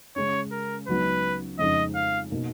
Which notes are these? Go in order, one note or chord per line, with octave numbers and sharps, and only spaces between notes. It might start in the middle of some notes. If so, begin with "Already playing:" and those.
C#3 G#3 C#4 C#5
A#4
C#2 C#3 F#3 B3 D#4 B4
F2 C#3 G#3 D#4 D#5
F5
B2 A#3 D#4